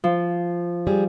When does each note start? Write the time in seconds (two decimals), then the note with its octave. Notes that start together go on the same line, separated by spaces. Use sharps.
0.04 F3
0.87 G3 G#4